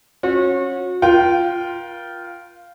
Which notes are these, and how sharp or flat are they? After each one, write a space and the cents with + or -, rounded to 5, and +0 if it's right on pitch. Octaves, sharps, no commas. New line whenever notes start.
C#4 -25 F#4 -35
F4 +0 A#4 +40 G5 -15